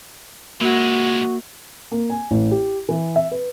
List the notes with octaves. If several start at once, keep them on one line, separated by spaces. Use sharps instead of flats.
A#2 G#3 A#3 F#4
A#3
G#5
A1
G4
E3
E5
B4